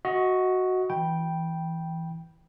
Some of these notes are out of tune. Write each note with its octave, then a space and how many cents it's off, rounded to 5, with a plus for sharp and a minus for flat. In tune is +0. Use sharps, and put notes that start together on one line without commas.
F#4 +0 D#5 +25
E3 +0 G5 +0 B5 -20